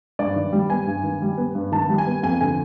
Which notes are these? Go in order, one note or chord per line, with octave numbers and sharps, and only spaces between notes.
G2 D5
D#3
G3
B3 G#5
G2
D#3
G3
B3
G2
D#3 A5
G3
G#5
B3
F2 G#5
D3 G#5